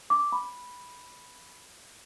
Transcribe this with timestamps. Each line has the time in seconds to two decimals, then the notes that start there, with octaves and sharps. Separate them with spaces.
0.10 D6
0.32 B5